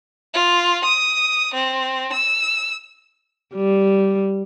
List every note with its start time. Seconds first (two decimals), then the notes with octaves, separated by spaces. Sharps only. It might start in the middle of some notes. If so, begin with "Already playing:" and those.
0.34 F4
0.85 D#6
1.54 C4
2.13 E6
3.55 G3